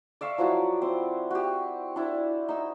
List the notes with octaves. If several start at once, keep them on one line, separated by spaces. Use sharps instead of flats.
D5 E5 F5 C#6
F3 F#3 E4 F#4
C4
F#4 G4
D4 E4
D#4 E6